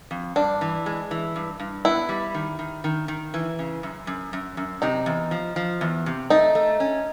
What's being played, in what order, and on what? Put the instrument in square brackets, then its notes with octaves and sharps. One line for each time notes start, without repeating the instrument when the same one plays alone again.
[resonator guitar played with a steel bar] F2
[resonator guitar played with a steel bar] G2 [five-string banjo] D4
[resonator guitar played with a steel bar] E3
G#3
E3
G2
G2
[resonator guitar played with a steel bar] B3 [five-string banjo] E4
[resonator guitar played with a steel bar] G3
D#3
D#3
D#3
D#3
E3
C#3
F#2
F#2
F#2
F#2
[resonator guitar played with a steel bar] C3 [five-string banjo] D#4
[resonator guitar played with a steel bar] E2
F3
F3
E2
C3
[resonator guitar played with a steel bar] A3 [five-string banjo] D#4
[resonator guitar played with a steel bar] A3
C#4